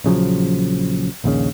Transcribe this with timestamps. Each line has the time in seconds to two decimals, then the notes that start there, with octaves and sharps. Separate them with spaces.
0.04 A#1 C#3 F3 F#3
1.24 A#1 D#2 C#3